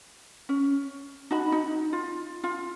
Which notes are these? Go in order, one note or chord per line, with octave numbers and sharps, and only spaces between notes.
C#4
D#4 F#4 B5
D#4
F4
F4